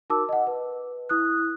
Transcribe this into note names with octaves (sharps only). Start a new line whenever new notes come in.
D#4 F#4 A#4 A5 D6 E6
D#5 F#5
B4
E4 D#6 F#6